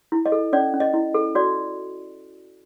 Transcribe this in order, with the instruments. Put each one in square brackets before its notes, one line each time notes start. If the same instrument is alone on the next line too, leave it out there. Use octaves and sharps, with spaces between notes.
[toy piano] E4
D#5
A4
C#4 D5
C#4
D#5
E4
A4
F#4 D5